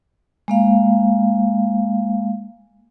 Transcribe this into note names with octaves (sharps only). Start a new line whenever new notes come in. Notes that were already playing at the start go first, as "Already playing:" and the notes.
G#3 A#3 F5